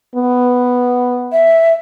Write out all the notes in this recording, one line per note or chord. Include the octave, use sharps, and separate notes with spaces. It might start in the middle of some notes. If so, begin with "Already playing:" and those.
B3
E5